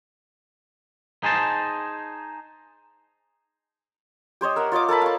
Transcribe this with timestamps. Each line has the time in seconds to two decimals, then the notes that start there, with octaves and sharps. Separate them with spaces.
1.23 D#4 G#4 C5 A5
4.41 G4 C5 C#5 D#5
4.56 A#4 E5 F#5
4.72 F4 C#5 D#5 D6
4.89 A4 A#4 A5 B5
5.01 F5 C#6